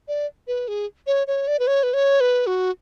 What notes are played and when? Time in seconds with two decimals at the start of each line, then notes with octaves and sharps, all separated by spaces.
0.08 D5
0.47 B4
0.68 G#4
1.07 C#5
1.27 C#5
1.48 D5
1.59 B4
1.67 C#5
1.83 B4
1.94 C#5
2.20 B4
2.47 F#4